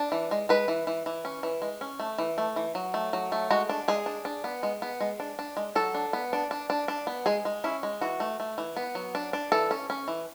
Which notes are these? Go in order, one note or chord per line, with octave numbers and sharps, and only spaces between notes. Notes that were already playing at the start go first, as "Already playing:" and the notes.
Already playing: D4
E3
G#3
G#3 B4
E3
E3
E3
C#4
E3
G#3
C#4
A3
E3
A3
E3
F#3
A3
F#3
A3
G#3 F#4
D4
G#3 G#4
D4
D4
B3
G#3
B3
G#3
D4
D4
G#3
F#3 A4
D4
B3
D4
D4
D4
D4
B3
G#3 G#4
G#3
C#4 E4
G#3
E3 F#4
A3
A3
E3
B3
F#3
D4
D4
E3 A4
C#4
C#4
E3